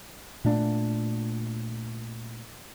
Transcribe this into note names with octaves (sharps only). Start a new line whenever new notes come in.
A#2 A3 D4